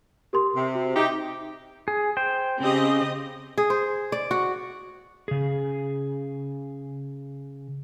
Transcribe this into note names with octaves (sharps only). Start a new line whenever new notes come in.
G4 A#4 C6
C3
F#4
D#4 G4 E5
G#4
C5 G5
C#3 C4 G4 D#5
G#4
C5
D5
F#4
C#3 G#4